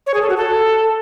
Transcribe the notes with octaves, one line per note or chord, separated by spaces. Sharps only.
C#5
G#4
A4
F#4
A4